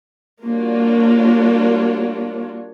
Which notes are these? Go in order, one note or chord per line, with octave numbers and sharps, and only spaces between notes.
G3 A#3 D4 F4 F#4 C#5